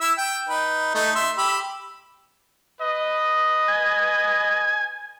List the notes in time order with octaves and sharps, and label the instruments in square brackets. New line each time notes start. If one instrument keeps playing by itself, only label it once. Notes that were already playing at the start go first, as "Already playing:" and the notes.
[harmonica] E4 E5 E6
G5
D#4 B4
A3 D#4
E5 C6
G4 B5 E6
[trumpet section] B4 D#5
[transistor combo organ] G#5